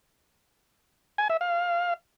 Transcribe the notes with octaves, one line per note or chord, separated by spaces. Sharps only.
G#5
E5
F5